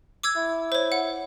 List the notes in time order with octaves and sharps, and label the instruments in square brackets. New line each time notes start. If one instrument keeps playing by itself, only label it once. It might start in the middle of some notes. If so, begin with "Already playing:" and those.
[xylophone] D6 E6 G#6
[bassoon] E4
[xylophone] C5 C#5
F#5